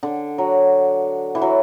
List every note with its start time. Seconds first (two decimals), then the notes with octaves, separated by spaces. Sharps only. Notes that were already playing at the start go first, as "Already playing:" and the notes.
0.03 D3
0.38 F#3
1.35 E3
1.42 F#3